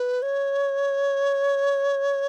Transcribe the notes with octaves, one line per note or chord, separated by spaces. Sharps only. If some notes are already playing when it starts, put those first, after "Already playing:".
Already playing: B4
C#5